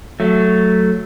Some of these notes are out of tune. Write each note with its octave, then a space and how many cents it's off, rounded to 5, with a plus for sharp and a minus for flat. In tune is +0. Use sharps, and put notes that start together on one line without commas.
F#3 +0 A3 +0